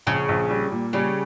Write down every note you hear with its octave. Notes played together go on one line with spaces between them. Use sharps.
A#1 C#3
A#1
G3
A#2
C#3 G3